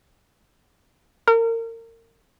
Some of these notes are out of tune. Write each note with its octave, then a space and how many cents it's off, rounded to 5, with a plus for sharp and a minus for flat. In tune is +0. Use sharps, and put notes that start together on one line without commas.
A#4 -30